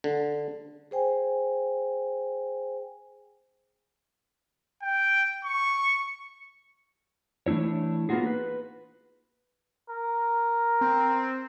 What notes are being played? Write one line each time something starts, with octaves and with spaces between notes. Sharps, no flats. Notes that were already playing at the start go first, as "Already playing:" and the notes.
D3
G#4 C5 G5 G#5
G5
C#6
E3 A3 D4 E4 C#5
A#3 B3 D#4 F4 F#4 G#4
B4
A#4
C4